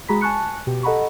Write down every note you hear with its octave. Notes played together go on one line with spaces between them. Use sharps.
G#3 F#4 G#4 A#5 B5 B6
G#5 A5 C#6 F#6 C#7
B2 G4
A4 D#5 F#5 A#5 B5 C#6